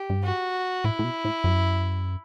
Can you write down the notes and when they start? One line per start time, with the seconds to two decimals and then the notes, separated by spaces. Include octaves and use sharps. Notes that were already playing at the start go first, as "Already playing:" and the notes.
Already playing: G4
0.10 G2
0.24 F#4
0.84 A2 E4
0.99 A2
1.04 B2
1.25 A2
1.44 F#2